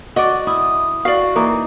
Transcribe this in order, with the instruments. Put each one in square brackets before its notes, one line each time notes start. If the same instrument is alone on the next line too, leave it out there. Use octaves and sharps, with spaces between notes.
[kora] F#4 D5 [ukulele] D#5
[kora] E4 [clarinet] D#6
[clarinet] F#4 [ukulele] D5 F5
[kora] E3 A#3 D#4